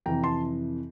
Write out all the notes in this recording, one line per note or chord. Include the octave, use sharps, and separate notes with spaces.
F2 C3 E3 G5 A#5
A5 C6